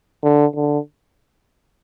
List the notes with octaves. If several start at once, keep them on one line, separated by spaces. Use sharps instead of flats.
D3
D3